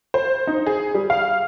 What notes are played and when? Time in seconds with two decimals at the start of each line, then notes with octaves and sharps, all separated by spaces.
0.14 C5
0.47 D#4
0.67 G#4
0.95 G3
1.10 F5